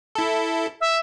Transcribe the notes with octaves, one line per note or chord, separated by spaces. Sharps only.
E4 A4
E5